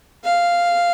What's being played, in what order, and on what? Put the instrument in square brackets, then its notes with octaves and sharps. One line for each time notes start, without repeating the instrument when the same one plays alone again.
[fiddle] F5